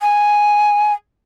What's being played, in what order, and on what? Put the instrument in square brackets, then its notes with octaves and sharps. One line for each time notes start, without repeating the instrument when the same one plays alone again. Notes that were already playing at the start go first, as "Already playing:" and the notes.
[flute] G#5